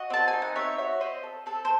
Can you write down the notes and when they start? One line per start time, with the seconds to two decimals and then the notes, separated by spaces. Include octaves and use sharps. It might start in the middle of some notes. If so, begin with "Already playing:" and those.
Already playing: F#4 D#5
0.10 C4 A5
0.28 G#5
0.33 D#4
0.42 F#5
0.55 C4 C#5 E5
0.78 F#4 C#5 E5
1.00 C4 C5 D#5
1.23 A4
1.46 C4 A4
1.65 C5